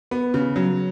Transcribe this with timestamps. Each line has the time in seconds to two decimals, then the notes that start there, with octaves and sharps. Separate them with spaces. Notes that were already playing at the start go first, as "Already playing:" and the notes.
0.11 B3
0.34 C#3
0.56 F#3